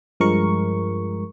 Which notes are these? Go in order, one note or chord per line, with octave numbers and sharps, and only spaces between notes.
G2 F3 G#3 A#4 C#6